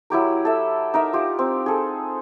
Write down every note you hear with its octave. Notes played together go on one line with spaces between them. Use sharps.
F#3 E4 G4 A#4
A4 E5
D#4 A#4 E5
F4 G4
C4
G#4 A4